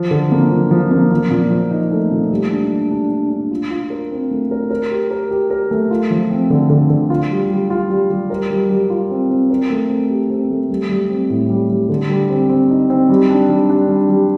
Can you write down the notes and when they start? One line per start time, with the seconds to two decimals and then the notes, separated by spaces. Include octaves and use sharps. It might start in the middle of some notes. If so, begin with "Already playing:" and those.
Already playing: F3
0.11 D3
0.32 A#3
0.51 F3
0.71 F3
0.91 A#3
1.11 F3
1.30 A#2
1.50 F3
1.71 D#4
1.92 A3
2.11 A#2
2.31 G3
2.50 D4
2.71 G3
2.91 D4
3.10 D4
3.30 D4
3.51 F4
3.70 F4
3.90 A#4
4.11 C4
4.31 A3
4.51 A#4
4.70 A#4
4.91 G4
5.11 A#4
5.31 G4
5.50 A#4
5.71 A3
5.91 F4
6.11 F3
6.31 C4
6.50 D3
6.70 D3
6.90 D3
7.10 F4
7.31 G3
7.50 G3
7.70 F4
7.90 G3
8.10 G3
8.30 A#4
8.50 G3
8.70 G3
8.90 F4
9.10 C4
9.31 C4
9.50 A#4
9.70 A3
9.89 C4
10.10 G4
10.30 C4
10.50 A3
10.70 G3
10.89 G3
11.09 C4
11.30 A2
11.50 G3
11.69 G3
11.89 D3
12.10 G3
12.30 C4
12.50 C4
12.70 D#4
12.90 C4
13.09 G3
13.30 D4
13.50 G3
13.69 D4
13.89 G3
14.09 G3